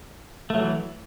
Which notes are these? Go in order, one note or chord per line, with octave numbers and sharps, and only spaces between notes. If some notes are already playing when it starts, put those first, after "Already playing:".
E3 F#3 A3